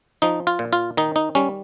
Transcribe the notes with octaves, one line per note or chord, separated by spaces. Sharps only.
F3 D#4
F4
A#2
F4
D#3 D#4
D#4
G3 C#4